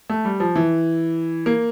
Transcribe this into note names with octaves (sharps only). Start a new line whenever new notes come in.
A3
G3
F3
E3
A#3